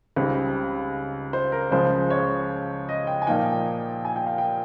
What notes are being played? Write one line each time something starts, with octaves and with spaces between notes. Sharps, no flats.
C#2 C#3 G3 C4 D#4
C5
A#4
C#2 C#3 F3 G#3 C5
C#5
D#5
G5
G#5
A#2 F3 A#3 D#4 G5
G#5
G5
F5
G5